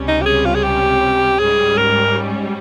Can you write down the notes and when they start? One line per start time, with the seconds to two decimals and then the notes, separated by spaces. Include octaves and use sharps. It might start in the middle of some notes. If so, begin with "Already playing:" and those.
Already playing: C#2 C3 G3 C#4
0.08 D#4
0.22 G4
0.26 G#4
0.45 F4
0.55 G#4
0.64 G4
1.39 G#2 G3 C#4 G#4
1.77 A#4